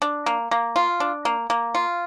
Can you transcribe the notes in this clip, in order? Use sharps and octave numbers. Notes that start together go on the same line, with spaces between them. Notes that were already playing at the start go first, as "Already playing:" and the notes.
D4
A#3
A#3
F4
D4
A#3
A#3
F4